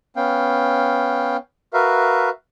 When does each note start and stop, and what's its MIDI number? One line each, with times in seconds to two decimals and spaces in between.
0.16 1.37 59
0.16 1.37 61
0.16 1.37 77
0.16 1.37 79
1.74 2.29 66
1.74 2.29 70
1.74 2.29 71
1.74 2.29 76
1.74 2.29 77